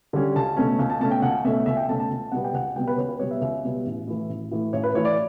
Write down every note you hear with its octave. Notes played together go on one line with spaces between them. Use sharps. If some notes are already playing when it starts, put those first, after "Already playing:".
D3 G3 C#4
C#2 A5
B2 A3 C#4
C#2
A5
B2 A3 C#4 A5
G5
C#2 F#5
B2 A3 C#4 E5
C#2 E5
G5
B2 A3 C#4 A5
A5
C#2
B2 G3 B3 F#5
G5
C#2 F#5
B2 G3 B3 G5
B4
C#2 C#5
B4
B2 G3 B3 C#5
E5
C#2 E5
B2 G3 B3
A1
A2 E3
A1
A2 E3
A1 C#5
B4
A2 E3 C#5
D5